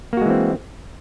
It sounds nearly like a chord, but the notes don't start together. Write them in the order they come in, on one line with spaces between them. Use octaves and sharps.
A#3 F#4 G#3 E3 C4